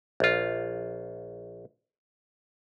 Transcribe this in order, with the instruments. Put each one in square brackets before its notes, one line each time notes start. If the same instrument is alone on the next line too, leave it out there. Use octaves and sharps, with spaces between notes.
[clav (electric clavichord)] A#1 F4